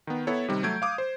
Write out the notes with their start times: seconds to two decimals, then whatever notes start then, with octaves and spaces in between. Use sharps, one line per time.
0.07 D#3 B3
0.27 B3 E4 A4 C#5
0.48 C3 D#3 G3
0.63 F#3 A3 G6 G#6 D7
0.82 F5 D6 D#6
0.98 C5